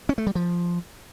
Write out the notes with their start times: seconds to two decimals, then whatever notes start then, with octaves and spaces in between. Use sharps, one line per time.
0.09 C#4
0.18 A3
0.27 G3
0.35 F3